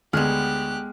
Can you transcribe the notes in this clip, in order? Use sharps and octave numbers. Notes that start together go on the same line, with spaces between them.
D2 G#3 B3 G4 G#4 F6 F#6